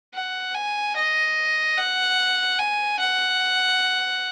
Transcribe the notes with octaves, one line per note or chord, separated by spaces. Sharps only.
F#5
G#5
D#5
F#5
G#5
F#5